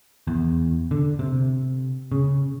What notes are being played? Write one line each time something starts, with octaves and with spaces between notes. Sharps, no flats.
E2
D3
C3
C#3